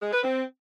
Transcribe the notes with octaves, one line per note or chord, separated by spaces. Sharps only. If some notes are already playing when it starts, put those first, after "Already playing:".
G#3
B4
C4